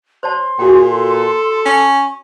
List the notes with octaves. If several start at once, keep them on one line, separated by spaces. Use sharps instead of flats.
C5 C#5 A5 C6
A#2 F#4 G#4 G5
A4
C#4 C#6